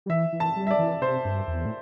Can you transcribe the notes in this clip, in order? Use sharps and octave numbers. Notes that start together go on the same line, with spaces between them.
G3
E3 E5
E3
A5
G3
E5
D5
E3
C3 C5
G2
E2
A2